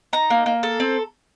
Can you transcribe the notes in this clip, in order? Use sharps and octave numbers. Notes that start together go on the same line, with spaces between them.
D#4 A#5
A#3
A#3
A4
C4